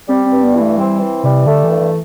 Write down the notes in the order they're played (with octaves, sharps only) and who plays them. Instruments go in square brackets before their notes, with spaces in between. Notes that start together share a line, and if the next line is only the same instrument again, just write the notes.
[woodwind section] G3 [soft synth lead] C4
[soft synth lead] C4
[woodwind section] G2
[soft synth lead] B3
[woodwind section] E3
[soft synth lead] A3
[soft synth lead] G3 [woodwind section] C4
[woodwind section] E3
[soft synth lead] C3 [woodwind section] G3
[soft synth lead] D3 [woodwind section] A3
[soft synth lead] E3
[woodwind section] G2
[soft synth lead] E3